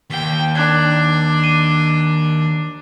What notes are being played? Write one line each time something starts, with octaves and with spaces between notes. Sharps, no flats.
D#2 G5
D4 D6 F#6 G#6
D6 D#7 G7